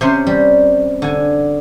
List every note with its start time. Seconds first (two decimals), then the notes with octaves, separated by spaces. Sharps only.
0.01 C3 C#4 C5
0.27 G3
1.02 D3 G#5